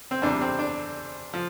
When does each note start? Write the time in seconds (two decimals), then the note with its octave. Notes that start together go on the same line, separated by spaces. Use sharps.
0.11 C4
0.22 E2 C3 G3 D4
0.41 C4
0.59 D4
1.34 F3